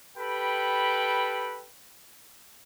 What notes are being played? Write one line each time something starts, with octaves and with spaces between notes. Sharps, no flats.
G4 A4 B4 G5 B5